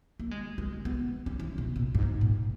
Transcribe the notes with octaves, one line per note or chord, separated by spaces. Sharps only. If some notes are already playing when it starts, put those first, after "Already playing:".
A#3
G#3
G#3
B3
C#4
E3
B2
A#2
G#2
A#2